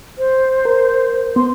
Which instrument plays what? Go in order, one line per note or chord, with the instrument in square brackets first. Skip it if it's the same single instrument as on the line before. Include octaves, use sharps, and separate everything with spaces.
[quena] C5
[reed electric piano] A#4
[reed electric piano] B3 [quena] C6